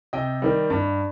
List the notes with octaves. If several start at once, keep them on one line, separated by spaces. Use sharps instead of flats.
C3 D#5 G5
D#3 G3
G2